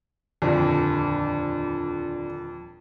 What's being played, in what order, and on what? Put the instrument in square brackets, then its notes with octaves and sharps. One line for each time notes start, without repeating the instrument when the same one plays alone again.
[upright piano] D#1 F2 [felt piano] D3